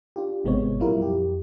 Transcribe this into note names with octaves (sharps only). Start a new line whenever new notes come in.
D4 F4 G4
G#1 C3 G#3 B3 C4 C#5
A#2 F#3 G3 E4 F4 A#4
F2 G4